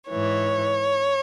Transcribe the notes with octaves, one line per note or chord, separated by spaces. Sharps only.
G#2 E3 C#5